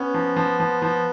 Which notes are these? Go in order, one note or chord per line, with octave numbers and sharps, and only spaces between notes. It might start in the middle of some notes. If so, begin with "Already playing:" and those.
Already playing: B3 C#4
F3
F3
F3
F3